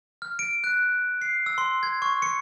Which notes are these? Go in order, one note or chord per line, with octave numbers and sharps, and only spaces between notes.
F6
D7
F#6
C7
E6
C6
G#6
C#6
C#7